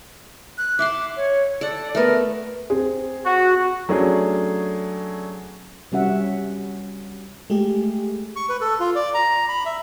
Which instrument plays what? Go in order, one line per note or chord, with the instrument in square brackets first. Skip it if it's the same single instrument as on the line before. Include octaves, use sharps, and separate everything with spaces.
[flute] F#6
[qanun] E5 F#5 C6 [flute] D6
[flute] C#5
[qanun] A4 F#5 [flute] D5
[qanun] A3 B3 [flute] A#4
[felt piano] C4 G#4
[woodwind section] F#4
[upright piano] F#3 A3 C#4 D4 G#4
[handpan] C3 G3 C#4 F#4 E5 F#5
[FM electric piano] G#3 A3 G4 G#4
[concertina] C#6
B4
A4
F4
D5
A#5
B5
E5